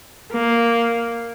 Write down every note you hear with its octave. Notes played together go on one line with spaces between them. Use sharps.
A#3